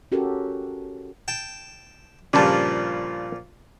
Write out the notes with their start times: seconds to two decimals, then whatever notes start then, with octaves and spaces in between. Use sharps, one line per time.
0.12 C#4 F#4 G4 A4 A#4
1.28 G5 A5
2.33 G2 A#2 C#3 F3 D5 A5